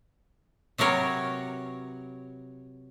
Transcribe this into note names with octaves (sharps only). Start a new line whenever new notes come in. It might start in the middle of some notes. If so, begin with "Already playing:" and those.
C3 F#3 B3 A#4 C#5